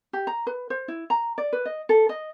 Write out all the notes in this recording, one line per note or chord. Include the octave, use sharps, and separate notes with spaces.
G4
A#5
B4
C5
E4
A#5
D5
B4
D#5
A4
D#5